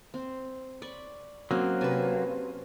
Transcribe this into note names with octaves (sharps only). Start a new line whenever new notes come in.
C4
D5 B5 C#6
F#3 A#3 C4 C#4
C3 B4 G#5 A5